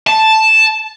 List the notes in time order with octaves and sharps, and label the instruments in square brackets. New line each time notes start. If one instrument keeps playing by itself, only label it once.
[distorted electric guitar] A5